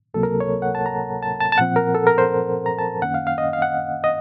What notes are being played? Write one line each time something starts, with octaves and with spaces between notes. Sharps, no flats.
C#2 C3 F#3 A#3 A4
A#4
C#5
F#5
A5
A#5
A5
A5
A5
A#2 F3 C4 F#5
A#4
A4
A#4
C5
A#5
A5
F#2 D#3 A#3 C#4 F#5
F5
F5
D#5
F5
F#5
D#5